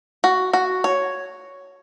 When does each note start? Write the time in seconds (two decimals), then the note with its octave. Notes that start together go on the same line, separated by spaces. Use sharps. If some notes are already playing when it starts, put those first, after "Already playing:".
0.24 F#4
0.53 F#4
0.84 C#5